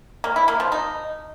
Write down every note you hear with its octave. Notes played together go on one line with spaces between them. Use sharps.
A#3
E4
A#3
F3
D#4